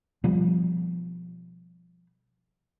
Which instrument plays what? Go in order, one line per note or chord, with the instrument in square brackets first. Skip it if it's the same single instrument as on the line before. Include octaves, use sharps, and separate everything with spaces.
[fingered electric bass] B2 F3 G3